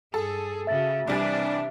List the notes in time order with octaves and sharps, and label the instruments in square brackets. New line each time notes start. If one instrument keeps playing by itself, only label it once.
[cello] G2 G#4 [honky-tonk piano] A4
[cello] C#3 F#4 [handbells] E5 A6
[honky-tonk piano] C2 G3 G#5 [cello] C3 E3 [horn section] D4